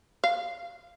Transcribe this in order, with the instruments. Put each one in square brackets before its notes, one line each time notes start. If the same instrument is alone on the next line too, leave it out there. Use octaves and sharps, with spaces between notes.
[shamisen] F5